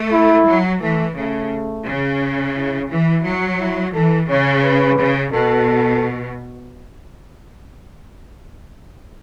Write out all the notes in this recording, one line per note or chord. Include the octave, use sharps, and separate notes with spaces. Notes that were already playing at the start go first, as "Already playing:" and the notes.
Already playing: A3
E4
F#3
E3 A3
C#3 A3
C#3
E4
E3 E4
F#3
E4
E3 A4
C#3 C#5
B4
C#3
B2 A4